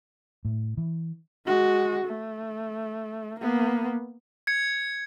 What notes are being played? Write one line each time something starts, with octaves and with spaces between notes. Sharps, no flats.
A2
E3
G#3 F#4
A3
A#3 B3
G#6 C#7